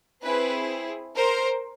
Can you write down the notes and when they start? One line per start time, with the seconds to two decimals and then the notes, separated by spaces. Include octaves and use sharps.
0.22 C4 E4 G#4 B4
1.16 A#4 C5